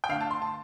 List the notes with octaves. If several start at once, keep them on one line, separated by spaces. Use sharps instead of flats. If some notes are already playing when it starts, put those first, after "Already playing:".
G5
D3 A3 F5
A5
C6
A5